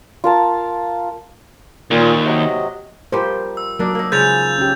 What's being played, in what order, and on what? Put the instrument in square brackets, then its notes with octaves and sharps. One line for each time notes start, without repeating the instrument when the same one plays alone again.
[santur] F4 A#4 A5
[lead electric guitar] D#2 [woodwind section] A#2
[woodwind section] C3 F#3 D#5
[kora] F3 G3 G4 [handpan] F4 A#4 C5
[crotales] E6
[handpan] F#3 [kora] A#3 D4 D#4
[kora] A#3 D#4
[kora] C#3 F3 G#3 [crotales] G6 A6 F7
[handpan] C#4 G4